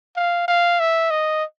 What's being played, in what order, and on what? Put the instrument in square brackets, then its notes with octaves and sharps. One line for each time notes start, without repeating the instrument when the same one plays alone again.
[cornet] F5
F5
E5
D#5